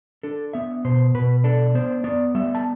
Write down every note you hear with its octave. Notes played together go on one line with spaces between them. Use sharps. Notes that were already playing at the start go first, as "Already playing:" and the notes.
D4 A4
B3 E5
B2 C5
B2 B4
D4 A4
B3 C5
B3 D5
G3 E5
A5